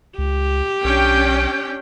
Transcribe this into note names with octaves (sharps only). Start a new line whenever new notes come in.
C#2 G4
B1 C#4 D4 G5